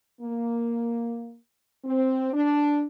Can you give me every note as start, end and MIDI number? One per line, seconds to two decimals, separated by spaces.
0.22 1.37 58
1.85 2.30 60
2.33 2.85 62